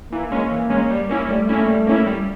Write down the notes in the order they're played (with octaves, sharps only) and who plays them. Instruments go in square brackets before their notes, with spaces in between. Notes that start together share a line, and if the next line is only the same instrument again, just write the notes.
[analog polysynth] E3 [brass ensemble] A#3
[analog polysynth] G#3 C#4
E3
G#3 C#4
G3
A#3 C#4 E4
[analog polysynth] G3 [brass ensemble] A3
[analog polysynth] A#3 C#4 E4
G3
A#3 C#4 E4
G3